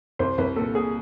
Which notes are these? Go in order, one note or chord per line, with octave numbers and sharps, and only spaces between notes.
C2 C5
C2 B4
A#2 A4
A#2 G#4